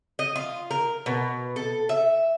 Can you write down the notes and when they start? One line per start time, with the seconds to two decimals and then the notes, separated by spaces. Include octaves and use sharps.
0.19 D#5
0.36 F4
0.71 A#4
1.06 B2
1.56 A4
1.89 E5